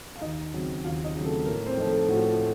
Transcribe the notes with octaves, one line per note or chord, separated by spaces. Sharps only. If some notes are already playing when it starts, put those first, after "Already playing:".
F5
D#2 D#4 D#5
C#3 F#3 C4
D#2 F4 F5
D#4 D#5
C#3 F#3 C4
A3 A4
A2 A#3 A#4
C4 C5
F3 A3 C4 D#4
A3 A4
A2 F#4
F4
F4